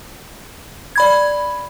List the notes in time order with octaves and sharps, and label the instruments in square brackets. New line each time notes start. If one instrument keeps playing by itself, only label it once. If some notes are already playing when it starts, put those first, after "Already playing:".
[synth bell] D5 B5 G#6